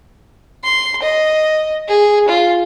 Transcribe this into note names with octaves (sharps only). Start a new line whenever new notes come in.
C6
D#5
G#4
F4